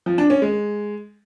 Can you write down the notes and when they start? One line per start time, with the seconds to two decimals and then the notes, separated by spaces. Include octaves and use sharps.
0.06 F3
0.18 D4
0.30 C#4
0.42 G#3